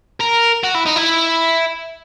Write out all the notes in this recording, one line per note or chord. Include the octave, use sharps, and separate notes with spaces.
A#4
F#4
E4
D#4
E4